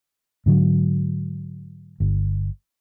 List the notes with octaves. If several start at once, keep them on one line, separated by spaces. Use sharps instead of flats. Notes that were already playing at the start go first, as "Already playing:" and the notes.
G#2 D3 F#3
G1